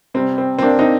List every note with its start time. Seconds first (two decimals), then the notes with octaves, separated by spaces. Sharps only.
0.14 C3 G3 C4
0.38 C4
0.59 C4
0.63 A#3 D4
0.79 C4 D#4